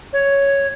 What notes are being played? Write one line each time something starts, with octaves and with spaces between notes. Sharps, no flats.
C#5